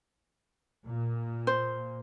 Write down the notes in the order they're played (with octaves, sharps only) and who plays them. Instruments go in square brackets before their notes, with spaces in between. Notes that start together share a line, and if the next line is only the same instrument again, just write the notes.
[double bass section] A#2
[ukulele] C5